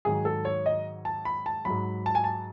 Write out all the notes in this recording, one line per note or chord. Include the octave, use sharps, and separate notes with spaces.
G#2 D#3 F#3 G#4
A4
C#5
D#5
A5
B5
A5
G#2 F#3 B5
A5
G#5
A5